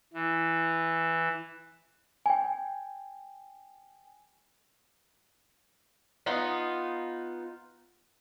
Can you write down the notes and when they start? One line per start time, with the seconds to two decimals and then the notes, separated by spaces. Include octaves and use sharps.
0.13 E3
2.26 G5 G#5
6.26 B3 D#4 F4